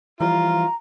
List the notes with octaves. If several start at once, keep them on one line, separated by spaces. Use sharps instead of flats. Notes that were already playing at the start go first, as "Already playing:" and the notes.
E3 F3 G3 F4 A#5